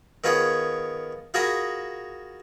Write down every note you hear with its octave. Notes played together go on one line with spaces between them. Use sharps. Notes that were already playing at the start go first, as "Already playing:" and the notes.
D#3 B3 F4 G#4 C#5
F4 F#4 G#4 A#4 B5 D#6